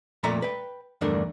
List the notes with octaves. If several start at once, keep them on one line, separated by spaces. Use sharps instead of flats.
F2 A#2 A3 D5 E5 A#5
B4 G5
E2 G2 D3 A3 D4 A#4